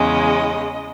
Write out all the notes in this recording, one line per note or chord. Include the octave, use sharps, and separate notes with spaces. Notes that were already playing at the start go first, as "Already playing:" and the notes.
Already playing: E2 C#3 G#3 D#5